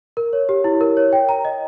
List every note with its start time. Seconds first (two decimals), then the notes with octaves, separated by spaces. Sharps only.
0.17 A#4
0.33 C#5
0.49 G4
0.64 E4
0.81 A#4
0.97 C#5
1.13 G5
1.29 A#5
1.45 D#5